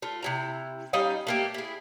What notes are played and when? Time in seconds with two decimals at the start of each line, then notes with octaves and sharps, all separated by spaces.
0.02 A3 F4
0.23 C3 E4 A#5
0.93 G3 C#4 D#4 F5
1.27 A3 A#3 G4
1.54 E4 G#4